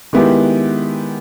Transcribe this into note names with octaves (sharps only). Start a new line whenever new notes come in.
D#3 G#3 B3 E4 G4